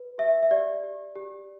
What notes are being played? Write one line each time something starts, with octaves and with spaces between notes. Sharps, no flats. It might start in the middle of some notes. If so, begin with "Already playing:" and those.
Already playing: B4
G4 E5
E5
G4 D5
G4
G4